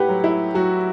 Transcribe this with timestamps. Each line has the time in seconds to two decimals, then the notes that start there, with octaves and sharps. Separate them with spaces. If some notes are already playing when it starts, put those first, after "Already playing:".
Already playing: A2 G4 B4 F#5
0.09 F#3
0.24 E4
0.54 F#3 F#4